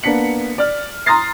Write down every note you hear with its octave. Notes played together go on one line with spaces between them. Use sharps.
A#3 B3 D4 B6 C#7 F#7
D5 F6
A#5 C6 D#6 F6 A6 C7